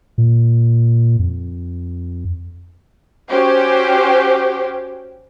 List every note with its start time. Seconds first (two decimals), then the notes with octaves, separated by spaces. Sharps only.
0.18 A#2
1.19 F2
3.29 C#4 F#4 G4 C5